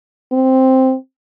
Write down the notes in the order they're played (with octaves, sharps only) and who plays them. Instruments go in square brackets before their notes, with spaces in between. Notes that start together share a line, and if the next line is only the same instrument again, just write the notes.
[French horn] C4